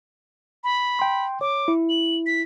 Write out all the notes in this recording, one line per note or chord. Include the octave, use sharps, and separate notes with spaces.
B5
G5 C6
C#5 D6
E4
F#7
B6